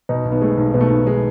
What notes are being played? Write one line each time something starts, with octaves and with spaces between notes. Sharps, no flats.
B2 D#4
B1
B3
G#3 A3
B1
B2 B3
A3
B1 B3
G#3